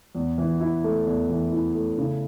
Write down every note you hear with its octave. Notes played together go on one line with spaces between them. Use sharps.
E2
E3
E4
A3
E2
E3
E4
A3
C#3